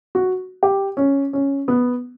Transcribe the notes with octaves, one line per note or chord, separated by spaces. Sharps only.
F#4
G4
C#4
C#4
B3